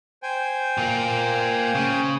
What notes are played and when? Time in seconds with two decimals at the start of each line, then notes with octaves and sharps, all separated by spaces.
0.23 C5 G5 G#5
0.78 A#2 A#3
1.75 C#3